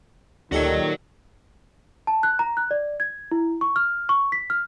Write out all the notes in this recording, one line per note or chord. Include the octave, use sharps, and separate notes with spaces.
D2 A#2 D#3 D4 F#4 G4 A4 C#5
A5
F#6
A#5
F#6
D5
G#6
E4
C#6
F6
C#6
B6
F6